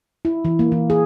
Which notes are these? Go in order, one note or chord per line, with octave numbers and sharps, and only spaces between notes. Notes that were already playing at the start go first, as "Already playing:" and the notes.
E4
E3
A#3
E3
G#4